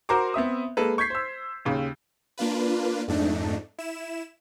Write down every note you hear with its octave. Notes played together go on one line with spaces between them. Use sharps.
F#4 A#4 C5 A#5 C6 D6
B3 C4 E5 D#6
G#3 A#3 A4 B4
C#6 G6 G#6 B6 C7
C5 E6
D#2 C#3
A#3 D4 F4 B4
F2 G#2 A3 D4 D#4
E4 E7